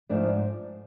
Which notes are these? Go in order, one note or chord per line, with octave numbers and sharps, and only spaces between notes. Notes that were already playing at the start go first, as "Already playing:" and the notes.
G#2 F3 A3 D4